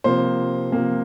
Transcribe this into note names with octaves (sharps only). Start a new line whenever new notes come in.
C3 F3 A#3 C5
C3 F3 A#3